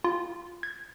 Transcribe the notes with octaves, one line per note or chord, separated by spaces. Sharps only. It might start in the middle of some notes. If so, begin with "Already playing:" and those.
F4
G#6